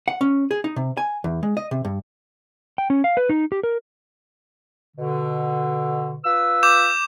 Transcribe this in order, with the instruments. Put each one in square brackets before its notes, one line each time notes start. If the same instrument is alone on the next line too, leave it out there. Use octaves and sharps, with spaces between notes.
[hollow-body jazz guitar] F#5
C#4
G#4
D#4
C3
G#5
E2
G#3
D#5
C3
G2
[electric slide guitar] G5
C#4
F5
B4
D#4
G4
A#4
[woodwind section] B2 D3
F4 B4 E6
[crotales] D6 G6 E7